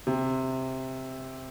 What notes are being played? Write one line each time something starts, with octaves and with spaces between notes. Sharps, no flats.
C3